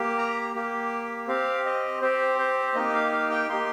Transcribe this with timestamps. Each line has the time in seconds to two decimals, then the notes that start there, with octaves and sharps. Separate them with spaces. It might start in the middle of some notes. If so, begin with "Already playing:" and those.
Already playing: A#3 G4
0.18 A#5
0.55 A#3 G4
1.28 C4 G4 F5
1.65 D#5
2.01 C4 G4 C5
2.39 C5
2.75 A#3 D#4 G4 D#5
2.94 F5
3.12 F5
3.31 G5
3.49 A#3 D#4 G4 C6